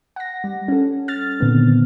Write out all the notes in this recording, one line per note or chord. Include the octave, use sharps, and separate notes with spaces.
F#5 A#6
G3
C#4 A4
F6 A6
A#2 D3 D#3 B3 C4